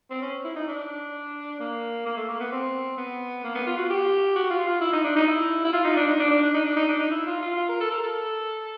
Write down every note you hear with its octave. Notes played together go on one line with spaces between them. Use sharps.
C4
C#4
E4
D#4
D4
A#3
A#3
A3
A#3
B3
C4
B3
A#3
B3
F4
F#4
G4
F#4
F4
F4
E4
D#4
D4
D#4
E4
E4
F4
D#4
D4
D#4
D4
D4
D4
D#4
D4
D#4
D4
D#4
E4
F4
F4
F4
A#4
A4
A#4
A4